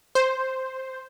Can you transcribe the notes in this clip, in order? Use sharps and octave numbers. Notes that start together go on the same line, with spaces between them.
C5